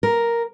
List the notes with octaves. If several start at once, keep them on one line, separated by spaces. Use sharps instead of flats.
A#4